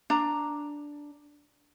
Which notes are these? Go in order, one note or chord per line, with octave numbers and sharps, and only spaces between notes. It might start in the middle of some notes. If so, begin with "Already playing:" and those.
D4 A#5